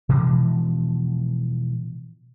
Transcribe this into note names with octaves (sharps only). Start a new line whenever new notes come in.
B2 E3 F3 G#3